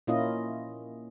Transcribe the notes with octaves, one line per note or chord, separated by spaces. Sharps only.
A#2 A#3 C#4 E4 F4 D#5